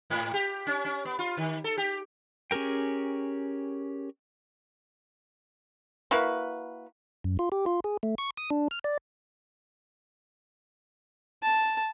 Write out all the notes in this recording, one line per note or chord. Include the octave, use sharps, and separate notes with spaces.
G#2
G4
C#4
C#4
B3
F4
D#3
A4
G4
C#4 G4 G#4 A#4 G5
A#3 E4 F#4 B4
F#2
F4
G4
F4
G#4
A3
C#6
D#6
D4
F6
D5
A5